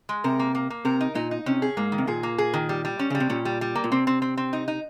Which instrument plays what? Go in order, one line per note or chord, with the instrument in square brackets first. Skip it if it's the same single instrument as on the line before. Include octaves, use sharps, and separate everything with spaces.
[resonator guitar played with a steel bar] G#3
[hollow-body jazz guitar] C3 [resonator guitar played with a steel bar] A#4
[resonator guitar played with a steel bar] A#3
A#3
A#3
[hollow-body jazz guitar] C3 [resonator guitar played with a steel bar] A#4
[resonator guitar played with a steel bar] D#4
[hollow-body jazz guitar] A#2 [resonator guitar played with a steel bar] D#4
[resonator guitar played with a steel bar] D#4
[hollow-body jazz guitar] C3 [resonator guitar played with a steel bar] C#4
[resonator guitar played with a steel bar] G#4
[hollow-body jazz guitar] G#2 [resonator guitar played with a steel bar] A#3
[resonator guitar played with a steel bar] D#3
[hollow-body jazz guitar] C3
[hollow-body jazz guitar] A#2 [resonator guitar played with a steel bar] G#4
[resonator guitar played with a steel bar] A#3
G#4
D#3
G3
G3
C#4
[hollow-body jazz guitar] C#3 [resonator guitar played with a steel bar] G3
[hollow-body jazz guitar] C3
[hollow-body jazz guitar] A#2 [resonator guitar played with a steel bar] C#4
[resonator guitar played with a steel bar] G3
G3
A#3
[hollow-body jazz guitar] A#2
[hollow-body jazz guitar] C3 [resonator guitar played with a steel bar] C4
[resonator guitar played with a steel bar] C4
C4
C4
D#4
D#4